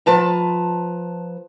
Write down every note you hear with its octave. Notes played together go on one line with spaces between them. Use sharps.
F3 B4 A5 A#5